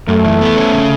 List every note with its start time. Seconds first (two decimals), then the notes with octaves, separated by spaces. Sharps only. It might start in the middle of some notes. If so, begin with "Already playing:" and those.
0.08 F#2 A3
0.25 E3
0.41 B3
0.57 C#4
0.73 C#3